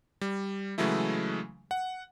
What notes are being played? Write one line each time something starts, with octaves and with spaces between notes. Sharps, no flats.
G3
C#3 E3 F#3 G#3 A3 E4
F#5